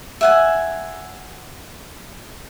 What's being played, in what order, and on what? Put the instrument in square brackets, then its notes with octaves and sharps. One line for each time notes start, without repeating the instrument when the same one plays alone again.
[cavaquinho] E5 F#5 G#5